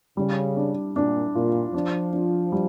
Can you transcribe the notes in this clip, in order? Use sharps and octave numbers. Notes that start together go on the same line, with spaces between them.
C#3 G3
D4
A#2 D4
A#2 F4
F3 D4
D4
G3